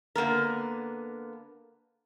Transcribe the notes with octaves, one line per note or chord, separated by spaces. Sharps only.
D3 A#3 B3 A#4